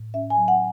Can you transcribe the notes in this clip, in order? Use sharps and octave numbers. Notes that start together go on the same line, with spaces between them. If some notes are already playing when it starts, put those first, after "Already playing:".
Already playing: A2
C#4 E5
G#5
F#3
F#5